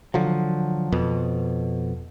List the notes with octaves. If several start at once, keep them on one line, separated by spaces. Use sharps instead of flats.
D3 F3 F#3
F2 B2